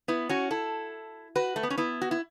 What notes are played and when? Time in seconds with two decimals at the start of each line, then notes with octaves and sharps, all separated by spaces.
0.08 B3 E4
0.29 C#4 F#4
0.51 E4 A4
1.35 F#4 B4
1.56 A3
1.63 B3
1.70 C#4
1.78 B3 E4
2.01 F#4
2.11 E4